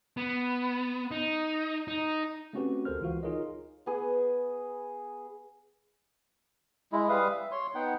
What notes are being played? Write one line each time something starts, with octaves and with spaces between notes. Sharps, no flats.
B3
D#4
D#4
A3 C4 C#4 F#4 G4 B4
D2 A4 A#4 C5 F6
C#2 E3 F4 F#4 F5
D#4 F4 G#4 A#4 C#5 D#5
B3 G#4
G#3 E4
G3 B4 F5 D#6
E5
C#5 C6
B3 D#4 F#5 G5